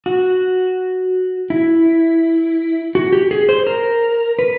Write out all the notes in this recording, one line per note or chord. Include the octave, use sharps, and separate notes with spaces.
F#4
E4
F#4
G4
G#4
C5
A#4
B4